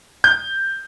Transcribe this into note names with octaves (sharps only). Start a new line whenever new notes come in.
G6